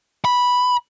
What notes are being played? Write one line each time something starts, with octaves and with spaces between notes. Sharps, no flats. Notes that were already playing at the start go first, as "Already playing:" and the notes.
B5